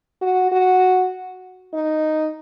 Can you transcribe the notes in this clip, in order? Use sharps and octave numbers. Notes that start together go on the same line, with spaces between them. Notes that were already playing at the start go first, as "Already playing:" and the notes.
F#4
F#4
D#4